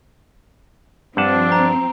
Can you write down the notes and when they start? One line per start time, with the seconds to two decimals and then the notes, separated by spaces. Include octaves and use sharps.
1.17 G2 F3 C4 D4 F#5 A5
1.52 A#5